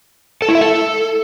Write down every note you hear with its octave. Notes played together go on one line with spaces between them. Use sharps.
A4
E4
E5
A4